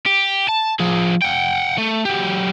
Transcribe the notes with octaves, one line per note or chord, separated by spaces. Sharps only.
G4
A5
F3 G#4
F#5 G5
A3
F#3 G4